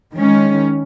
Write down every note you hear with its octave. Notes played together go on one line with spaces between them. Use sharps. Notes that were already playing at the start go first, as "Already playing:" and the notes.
D#3 G#3 C#4